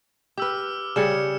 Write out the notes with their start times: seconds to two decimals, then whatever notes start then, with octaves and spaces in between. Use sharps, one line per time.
0.38 G4 B4 D6 E6 F6
0.96 C#3 G3 G#4 C#7 E7